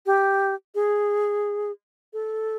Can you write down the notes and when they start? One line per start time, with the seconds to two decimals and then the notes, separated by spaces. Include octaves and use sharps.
0.06 G4
0.75 G#4
2.13 A4